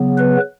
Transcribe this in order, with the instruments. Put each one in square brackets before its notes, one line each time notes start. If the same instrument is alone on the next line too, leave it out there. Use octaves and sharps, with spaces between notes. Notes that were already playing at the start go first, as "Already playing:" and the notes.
Already playing: [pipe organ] C#3 F#3 B3
B4